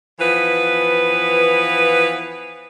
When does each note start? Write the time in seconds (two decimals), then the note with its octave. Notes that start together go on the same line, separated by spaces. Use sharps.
0.20 E3 F3 B3 F4 B4